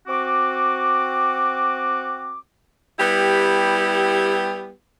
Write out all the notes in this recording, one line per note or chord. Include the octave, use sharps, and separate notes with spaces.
C4 F#4 D6
G3 B3 E4 G4